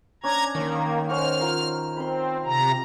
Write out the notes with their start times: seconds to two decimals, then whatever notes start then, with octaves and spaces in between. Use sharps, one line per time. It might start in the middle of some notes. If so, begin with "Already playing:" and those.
0.24 C#4 D4 A#5 G#6
0.55 D#3 A#3 C#4
1.09 C#4 C5 F#5 F6
1.39 F4 A#4 F5
1.97 C4 B5 C6
2.46 C3 A#5